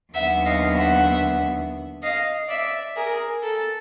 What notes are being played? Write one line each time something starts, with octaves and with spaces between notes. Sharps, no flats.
D#2 D3 F#3 B3 E5 F#5
D#5 F5
E5 F#5
D#5 F5
D5 E5
G#4 A#4
A4